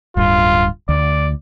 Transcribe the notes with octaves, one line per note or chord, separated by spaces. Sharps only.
D1 G2 F4
D2 D5